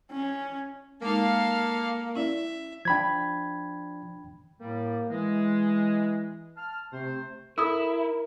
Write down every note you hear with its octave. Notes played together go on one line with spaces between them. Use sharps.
C#4
G#3 A#3 D#4 A4 F5
C#4 E4 D5 E5
F3 D4 G5 B5 G#6
A2 G3 A#3
E3 G#3
A5 F6
C3 A3 C5
E4 A4 A#4 D#6 E6